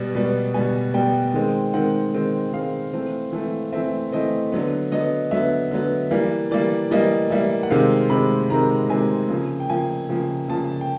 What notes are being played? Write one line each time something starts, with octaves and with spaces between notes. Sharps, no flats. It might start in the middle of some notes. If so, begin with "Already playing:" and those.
Already playing: B2 G3 B3
B2 G3 B3
B2 G3 B3 G#5
B2 G3 B3 G5
D#3 G#3 C4
D#3 G#3 C4 F#5
D#3 G#3 C4
D#3 G#3 C4 F5
E3 A3 C4
E3 A3 C4
E3 A3 C4 E5
E3 A3 C4 D#5
D3 F#3 B3
D3 F#3 B3 D#5
D3 F#3 B3 E5
D3 F#3 B3
E3 G3 A#3
E3 G3 A#3 D5
E3 G3 A#3 D#5
E3 G3 A#3 E5
F#5
C3 D#3 G#3 C4 F5
C3 D#3 G#3 C4 B5
C3 D#3 G#3 C4 A#5
C3 D#3 G#3 C4 G#5
C#3 F3 A#3
G5
C#3 F3 A#3 G#5
C#3 F3 A#3
C#3 F3 A#3 A5
G5